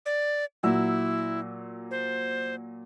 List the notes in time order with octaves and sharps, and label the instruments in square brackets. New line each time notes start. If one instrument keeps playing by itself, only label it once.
[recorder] D5
[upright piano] A#2 F#3 E6 [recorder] E4
[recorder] C5